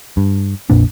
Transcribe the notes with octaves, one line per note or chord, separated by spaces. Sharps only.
G2
A#1 F2 A#2 D4